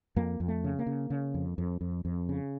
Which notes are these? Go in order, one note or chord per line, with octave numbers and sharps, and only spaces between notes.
F2 A#3
F2
A3
C#3
A#3
C#3
C#3
F2
F2
F2
F2
C#3